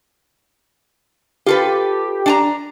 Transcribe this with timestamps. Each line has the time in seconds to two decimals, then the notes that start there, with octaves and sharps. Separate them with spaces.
1.46 F4 G4 A4 B4
2.26 D4 G#5 A#5